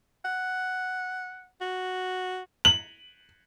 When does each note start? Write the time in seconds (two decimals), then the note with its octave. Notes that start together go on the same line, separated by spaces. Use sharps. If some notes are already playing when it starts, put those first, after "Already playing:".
0.25 F#5
1.61 F#4
2.65 F#7